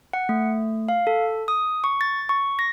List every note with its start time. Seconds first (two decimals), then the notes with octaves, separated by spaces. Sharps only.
0.13 F#5
0.29 A3
0.89 F5
1.07 A4
1.48 D#6
1.84 C#6
2.01 A6
2.29 C#6
2.59 A#6